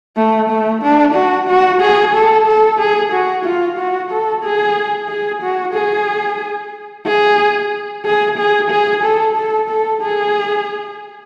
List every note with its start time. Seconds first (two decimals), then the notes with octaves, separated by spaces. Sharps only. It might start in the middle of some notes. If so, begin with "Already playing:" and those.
0.17 A3
0.50 A3
0.82 D4
1.15 F#4
1.48 F#4
1.81 G#4
2.14 A4
2.47 A4
2.80 G#4
3.13 F#4
3.45 F4
3.78 F#4
4.11 A4
4.44 G#4
5.09 G#4
5.43 F#4
5.75 G#4
7.06 G#4
8.06 G#4
8.38 G#4
8.71 G#4
9.04 A4
9.36 A4
9.70 A4
10.02 G#4